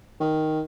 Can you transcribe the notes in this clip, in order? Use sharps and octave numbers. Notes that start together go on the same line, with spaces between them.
D#3